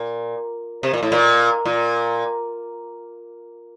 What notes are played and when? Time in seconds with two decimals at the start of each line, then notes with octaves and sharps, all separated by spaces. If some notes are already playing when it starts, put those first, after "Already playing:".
Already playing: A#2
0.83 C3
0.94 A#2
1.03 A2
1.12 A#2
1.66 A#2